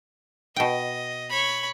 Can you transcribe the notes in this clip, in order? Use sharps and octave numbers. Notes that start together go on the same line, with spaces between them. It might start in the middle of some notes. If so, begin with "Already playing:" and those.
B2 D#5 G5
C#5 B5